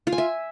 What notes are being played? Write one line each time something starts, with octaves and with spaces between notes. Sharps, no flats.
F4
G#5
E5